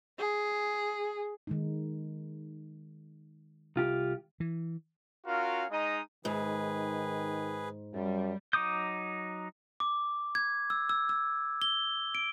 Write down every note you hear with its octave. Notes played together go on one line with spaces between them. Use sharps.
G#4
D#3 G#3 D#4
C2 F4 G4
E3
C#4 F4 F#4 A#4 F5
G#3 D#4 D#5 A#5 D#6
G#2 D#3 G#4 B4
F#2 G3
F#3 D#4 D6 D#6 G6
D6
G#6
E6
E6
E6
G7
D7